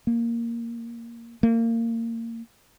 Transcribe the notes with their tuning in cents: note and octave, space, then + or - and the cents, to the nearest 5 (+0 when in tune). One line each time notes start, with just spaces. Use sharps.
A#3 +0
A#3 -25